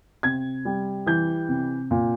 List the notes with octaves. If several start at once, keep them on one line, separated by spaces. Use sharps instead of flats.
C3 G#6
G3
E3 G6
C3
A#2